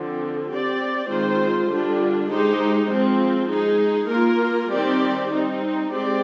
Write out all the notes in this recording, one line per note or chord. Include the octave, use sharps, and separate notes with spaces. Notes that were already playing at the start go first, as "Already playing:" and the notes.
Already playing: D3 F3 C4
C4 G4 D5
D#3 G#3 C4 F4 C5
D3 G3 D4 F4
G#3 D#4 G4 C5
F3 G#3 C4
G#3 D#4 G#4
A#3 F4 A#4
D#3 G3 C4 G4 D5
G3 C4 D#4
G#3 C4 G4 D5